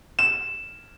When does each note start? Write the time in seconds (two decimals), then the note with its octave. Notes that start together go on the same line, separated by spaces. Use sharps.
0.19 E7